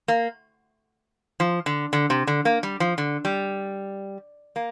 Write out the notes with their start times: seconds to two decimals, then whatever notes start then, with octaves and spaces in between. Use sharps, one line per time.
0.08 A#3
1.40 F3
1.66 D3
1.93 D3
2.10 C3
2.27 D3
2.45 A#3
2.63 G3
2.80 F3
2.98 D3
3.25 G3
4.56 A#3